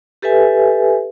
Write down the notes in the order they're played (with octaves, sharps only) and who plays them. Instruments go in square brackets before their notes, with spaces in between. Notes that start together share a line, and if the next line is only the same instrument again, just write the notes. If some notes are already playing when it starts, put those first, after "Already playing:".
[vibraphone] G4 A4 B4 E5 G#5